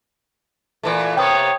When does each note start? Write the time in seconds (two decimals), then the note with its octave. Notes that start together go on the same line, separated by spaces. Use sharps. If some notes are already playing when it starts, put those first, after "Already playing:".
0.83 A#2 E3 A3
1.17 C3 A#3 B3 C#5 G5 D#6